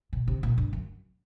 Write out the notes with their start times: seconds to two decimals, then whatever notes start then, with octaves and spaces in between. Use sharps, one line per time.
0.13 B2
0.28 C3
0.43 A#2
0.58 G2
0.73 F#2